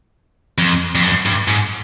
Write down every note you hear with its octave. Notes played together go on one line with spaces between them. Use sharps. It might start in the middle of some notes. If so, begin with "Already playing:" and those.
F2
F2
F#2
G2
G#2